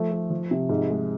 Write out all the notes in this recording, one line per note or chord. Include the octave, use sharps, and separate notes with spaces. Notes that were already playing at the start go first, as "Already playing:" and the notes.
Already playing: F3 A3
A3
F3
C3
G#2
G#3